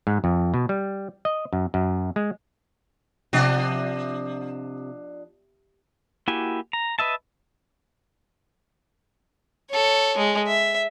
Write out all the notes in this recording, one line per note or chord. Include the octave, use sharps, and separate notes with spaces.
G#2
F2
B2
G3
D#5
F#2
F#2
G#3
C3 F3 D4 D#5
A#3 E4 F#4 G4 G#5
A#5
B4 D#5 E5 A5
A4 C#5
G#3
E5